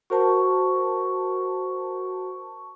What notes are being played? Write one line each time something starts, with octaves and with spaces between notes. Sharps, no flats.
F#4 A#4 C5 A5 C#6